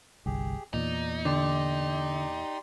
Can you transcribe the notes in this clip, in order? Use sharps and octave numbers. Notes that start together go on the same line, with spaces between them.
G1 C2 G4 G#4
E2 A#2 D#4 D5
D3 G4 D5 C6